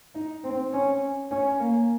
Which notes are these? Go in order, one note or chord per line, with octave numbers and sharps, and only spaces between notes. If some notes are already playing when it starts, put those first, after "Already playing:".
D#4
C4
C#4
C#4
A#3